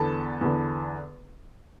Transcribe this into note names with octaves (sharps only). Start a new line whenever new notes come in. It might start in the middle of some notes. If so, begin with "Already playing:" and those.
Already playing: E2 D3 B3 A4 A5
E2 D3 B3